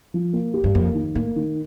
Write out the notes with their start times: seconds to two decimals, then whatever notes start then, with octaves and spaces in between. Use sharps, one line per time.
0.14 F3
0.33 A#3
0.54 G4
0.64 G2
0.75 F2 A#3
0.95 D#3
1.15 A2 A#3
1.36 D#3